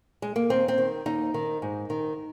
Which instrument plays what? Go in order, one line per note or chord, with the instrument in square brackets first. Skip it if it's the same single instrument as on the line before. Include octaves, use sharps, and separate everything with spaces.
[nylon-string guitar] G#3
A#3
D#2 C4
C4
D#3
D#2 D#4
D#3
G#2
D#3